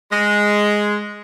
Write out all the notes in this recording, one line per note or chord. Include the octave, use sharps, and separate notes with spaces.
G#3